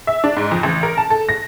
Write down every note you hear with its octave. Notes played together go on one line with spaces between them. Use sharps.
E5
D4
G#2
F2
A1
A#4
A5
A4
A#6